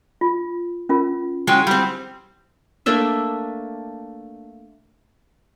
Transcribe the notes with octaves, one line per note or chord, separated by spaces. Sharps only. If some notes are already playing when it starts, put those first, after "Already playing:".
F4
C#4 F4 A#4
F#3 G#3 C#4 E4 G5
G3 C4
A3 A#3 D4 E5